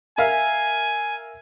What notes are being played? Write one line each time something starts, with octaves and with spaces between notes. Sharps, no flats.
A#4 E5 F5 G#5